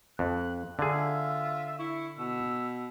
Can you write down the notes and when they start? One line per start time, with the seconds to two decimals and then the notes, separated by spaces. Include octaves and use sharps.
0.19 F2 F#6
0.79 D3 F4 G#4 E5
1.79 E4 C#6
2.19 B2 E6